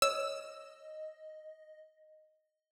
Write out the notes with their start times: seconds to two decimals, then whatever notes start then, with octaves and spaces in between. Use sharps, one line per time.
0.02 C#5 D#5 E6